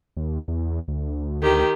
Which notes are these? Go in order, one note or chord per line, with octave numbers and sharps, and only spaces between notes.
D#2
E2
D2
D#3 G4